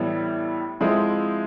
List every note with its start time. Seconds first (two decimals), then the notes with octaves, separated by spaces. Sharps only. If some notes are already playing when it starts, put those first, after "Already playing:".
Already playing: A2 E3 G3 B3 E4
0.81 F3 G#3 C4 E4